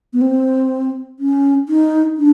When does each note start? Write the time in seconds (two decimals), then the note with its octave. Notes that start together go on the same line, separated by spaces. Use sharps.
0.13 B3
0.21 C4
1.19 C#4
1.69 D#4
2.17 D4